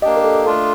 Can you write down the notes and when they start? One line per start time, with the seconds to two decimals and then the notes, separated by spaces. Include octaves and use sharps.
0.02 A#3 D4 G4 D#5
0.17 A#4
0.24 A4
0.46 A3 D4 F4 A4